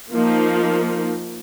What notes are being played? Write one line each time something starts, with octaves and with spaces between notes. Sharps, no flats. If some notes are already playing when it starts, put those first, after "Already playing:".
F3 A#3 D#4